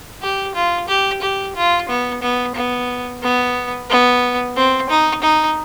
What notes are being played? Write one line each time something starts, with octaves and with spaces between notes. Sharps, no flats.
G4
F4
G4
G4
F4
B3
B3
B3
B3
B3
C4
D#4
D#4